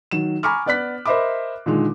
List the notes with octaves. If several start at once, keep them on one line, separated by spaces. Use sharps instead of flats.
D#3 F#3 E7
G#5 A#5 B5 C#6 D6 F6
B3 D5 F#6 B6
A#4 C5 D#5 E5 B5 D6
A#2 D3 D#3 G#3